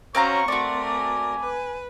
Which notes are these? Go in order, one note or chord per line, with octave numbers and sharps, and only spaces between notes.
C4 C#4 F#4 C5 C#5 F5 A#5 C#6
A3 C4 F#4 A#4 D5 C6
G#5 D6
B4